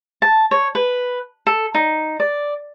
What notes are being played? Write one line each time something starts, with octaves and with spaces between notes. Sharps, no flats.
A5
C#5
B4
A4
D#4
D5